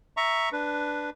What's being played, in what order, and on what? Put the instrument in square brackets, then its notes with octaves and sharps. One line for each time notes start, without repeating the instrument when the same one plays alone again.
[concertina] E5 A#5 C#6
D4 B4